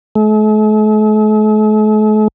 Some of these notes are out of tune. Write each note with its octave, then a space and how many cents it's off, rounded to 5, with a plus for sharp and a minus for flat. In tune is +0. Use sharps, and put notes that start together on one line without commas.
A3 -45